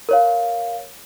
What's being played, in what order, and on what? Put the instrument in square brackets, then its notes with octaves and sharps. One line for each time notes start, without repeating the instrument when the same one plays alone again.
[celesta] A#4 C#5 F5